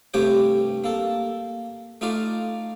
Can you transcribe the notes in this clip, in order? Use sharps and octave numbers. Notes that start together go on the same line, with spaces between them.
G2 C3 A3 G4 C#5 G5
A#3 A4
A3 D#4 F4 D5 F5